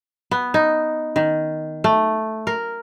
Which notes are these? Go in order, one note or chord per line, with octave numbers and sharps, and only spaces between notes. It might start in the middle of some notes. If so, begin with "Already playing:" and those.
B3
D#4
D#3
A3
A#4